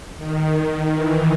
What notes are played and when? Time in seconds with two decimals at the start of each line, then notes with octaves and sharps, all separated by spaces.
0.18 D#3
0.94 E3